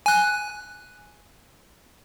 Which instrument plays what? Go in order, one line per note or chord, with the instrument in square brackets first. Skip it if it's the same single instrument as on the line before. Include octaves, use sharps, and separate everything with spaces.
[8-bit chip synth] G#5 F#6